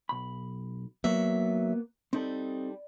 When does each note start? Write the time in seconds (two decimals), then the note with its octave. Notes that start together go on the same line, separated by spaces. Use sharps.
0.09 B1 B5
1.04 D#3 F#3 A#3 B3 E5
2.13 G3 C4 D#4 A4